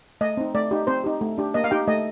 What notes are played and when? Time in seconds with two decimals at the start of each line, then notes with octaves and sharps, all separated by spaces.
0.21 A3 D#5
0.37 C4 D#4
0.55 A3 D5
0.71 D#4 G4
0.87 C4 C5
1.04 D#4 G4
1.21 A3
1.38 D4 G4
1.54 A#3 D#5
1.64 F5
1.71 D#4 G4 G5
1.87 A3 D#5